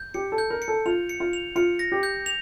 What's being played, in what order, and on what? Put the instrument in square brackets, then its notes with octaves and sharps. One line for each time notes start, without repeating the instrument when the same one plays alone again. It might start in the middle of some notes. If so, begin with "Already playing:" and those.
Already playing: [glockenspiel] G6
[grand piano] G4 [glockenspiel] C#7
[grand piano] A4
[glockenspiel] G6
[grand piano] A#4
[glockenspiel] C#7
[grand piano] A4
[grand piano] F4 [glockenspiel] F7
[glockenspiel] C#7
[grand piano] F4
[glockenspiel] F7
[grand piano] F4 [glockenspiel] C#7
[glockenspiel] A#6
[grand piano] G4
[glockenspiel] G6
F7